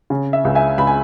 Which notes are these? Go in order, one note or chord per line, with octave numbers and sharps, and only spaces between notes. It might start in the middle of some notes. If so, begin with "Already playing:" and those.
C#3
E5
C#2
E5 G#5
C#2 B5
G#5